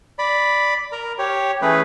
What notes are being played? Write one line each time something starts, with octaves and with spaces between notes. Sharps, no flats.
D5 B5
A#4 A#5
G4 C#5
E3 A3 C#4 G#4 B4